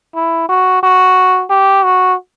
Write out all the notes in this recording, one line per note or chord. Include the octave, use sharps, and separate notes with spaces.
E4
F#4
F#4
G4
F#4